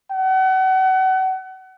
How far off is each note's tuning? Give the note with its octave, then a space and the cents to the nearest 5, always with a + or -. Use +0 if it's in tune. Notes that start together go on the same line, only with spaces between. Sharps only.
F#5 +35